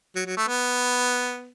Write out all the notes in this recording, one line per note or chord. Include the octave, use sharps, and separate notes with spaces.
F#3
F#3
A3
B3